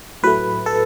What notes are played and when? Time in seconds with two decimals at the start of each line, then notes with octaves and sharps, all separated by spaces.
0.23 A2 F#3 A3 B4
0.66 A4